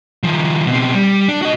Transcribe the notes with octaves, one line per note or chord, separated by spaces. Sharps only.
D#3 F3
B2 C4
G3
D4
F#4 D#5